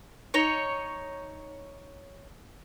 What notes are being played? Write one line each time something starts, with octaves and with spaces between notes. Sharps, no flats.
D#4 C#5